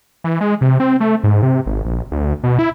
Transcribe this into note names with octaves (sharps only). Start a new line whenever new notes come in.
E3
G#3
C3
C4
A3
G#2
C3
G#1
A#1
D2
B2
E4